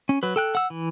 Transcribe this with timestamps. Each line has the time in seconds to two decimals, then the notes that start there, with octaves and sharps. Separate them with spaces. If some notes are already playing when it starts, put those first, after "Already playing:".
0.09 C#4
0.23 F#3 B4
0.36 A4 G5 F#6
0.55 F#5 E6
0.70 E3